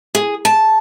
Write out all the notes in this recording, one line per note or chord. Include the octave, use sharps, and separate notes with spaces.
G#4
A5